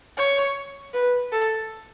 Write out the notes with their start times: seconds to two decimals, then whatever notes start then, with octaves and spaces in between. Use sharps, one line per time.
0.17 C#5
0.94 B4
1.32 A4